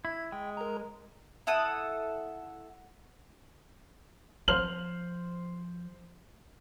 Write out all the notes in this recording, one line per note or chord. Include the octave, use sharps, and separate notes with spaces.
E4 G#6
G#3 G5
A#4 A#5
E4 A4 F#5 D#6
F3 C5 F6 F#7